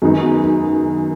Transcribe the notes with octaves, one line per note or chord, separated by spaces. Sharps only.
F#2 D#3 G#3 B3 D#4